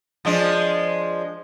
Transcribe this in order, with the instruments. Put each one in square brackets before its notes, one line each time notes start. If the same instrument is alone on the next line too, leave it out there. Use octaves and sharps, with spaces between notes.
[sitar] F3 G#3 D4